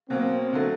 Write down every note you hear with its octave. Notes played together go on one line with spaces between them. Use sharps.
B2 F#3 A#3 C4
D3 F#3 A3